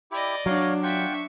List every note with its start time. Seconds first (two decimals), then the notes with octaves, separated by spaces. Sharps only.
0.11 E4 G4 D5 D#5
0.46 F#3 D4 C#5 F5
0.83 F4 E5 F#5 G5 C#6